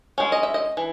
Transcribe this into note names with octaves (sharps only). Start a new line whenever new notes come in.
G#3 C#4
D#5
E5
D#5
E3